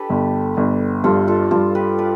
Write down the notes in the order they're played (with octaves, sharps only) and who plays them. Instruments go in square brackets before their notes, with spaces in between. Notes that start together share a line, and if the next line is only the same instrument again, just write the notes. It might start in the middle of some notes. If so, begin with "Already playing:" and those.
Already playing: [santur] D4 G4 A4 B4
[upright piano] G1
G1
[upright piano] G2 [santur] F4 A4
[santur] F4 A4
[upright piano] G2 [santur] F4 A4
[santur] G4 B4
B4 D5